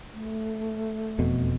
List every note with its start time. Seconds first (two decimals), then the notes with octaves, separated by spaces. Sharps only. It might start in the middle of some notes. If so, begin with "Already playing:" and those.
0.13 A3
1.18 E1 F2 B2